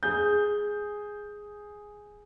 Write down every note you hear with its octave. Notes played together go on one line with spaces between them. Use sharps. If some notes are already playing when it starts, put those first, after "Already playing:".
G#4 G6